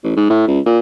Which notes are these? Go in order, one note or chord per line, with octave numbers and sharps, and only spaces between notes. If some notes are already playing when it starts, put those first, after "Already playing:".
A1
G#2
A2
C#2
A#2